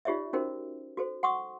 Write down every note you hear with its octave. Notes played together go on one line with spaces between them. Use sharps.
D#4 F4 G4 C#5 D5 E5
C#4 D#4 F#4 A#4 C5
F#4 A4 C5
F#5 C6 C#6 D#6